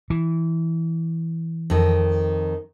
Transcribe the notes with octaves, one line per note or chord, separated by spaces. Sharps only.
E3
F2 D#3